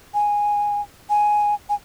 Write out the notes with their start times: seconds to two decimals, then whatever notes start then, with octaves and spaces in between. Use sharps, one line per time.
0.14 G#5
1.10 G#5
1.69 G#5